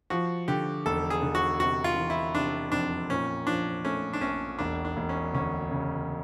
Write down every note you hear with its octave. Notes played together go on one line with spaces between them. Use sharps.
F3 F#4
D3 G4
E1 A4
G#4
D3
F#4
C3 F#4
F4
E3
E4
C3 D4
F2 D4
A#2 C#4
F3 D4
A3 C#4
D4
A#1 C#4
E1 D4
D4
E1
C#4
D2 C#4
C#3